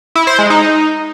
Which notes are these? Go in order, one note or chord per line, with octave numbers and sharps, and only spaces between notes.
E4
C5
G#3
D#4